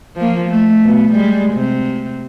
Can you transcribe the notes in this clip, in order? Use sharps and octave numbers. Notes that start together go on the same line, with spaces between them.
F3 A#3
A3
B2
G3 G#3
C3